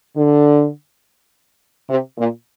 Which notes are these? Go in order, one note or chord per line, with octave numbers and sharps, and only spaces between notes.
D3
C3
A#2